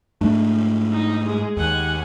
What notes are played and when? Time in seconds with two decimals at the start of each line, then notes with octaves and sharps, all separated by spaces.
0.21 G#2 A3 D4
0.93 D#4
1.25 G#3 G#4
1.57 D#2 F#5 G#5